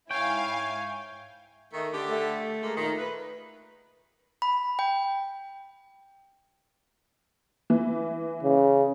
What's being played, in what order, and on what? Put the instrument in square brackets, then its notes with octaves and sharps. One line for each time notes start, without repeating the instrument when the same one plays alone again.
[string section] G#2 E4 G#5 [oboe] C#5 [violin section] F5 [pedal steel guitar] G5
[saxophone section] D#3 A3
D3 G4
[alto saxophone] A3
[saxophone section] G#3 A#3
A#2 D#3
B4
[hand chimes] B5
G5
[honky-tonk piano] E3
[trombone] C#3